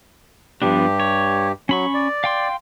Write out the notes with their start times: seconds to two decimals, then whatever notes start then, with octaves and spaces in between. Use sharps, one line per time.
0.62 G2 F3 B3 D4 G4
1.00 C#5
1.69 F#3 C#4 B5 C#6
1.94 D5
2.24 F5 G5 C6